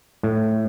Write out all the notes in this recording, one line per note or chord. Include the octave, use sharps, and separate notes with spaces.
A2